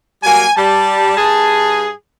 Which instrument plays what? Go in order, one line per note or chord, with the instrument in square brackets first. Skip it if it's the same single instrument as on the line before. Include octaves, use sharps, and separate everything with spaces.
[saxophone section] F#3 G3 A#3 [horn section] G#5
[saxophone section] G3 [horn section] A5
[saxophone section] G2 G#4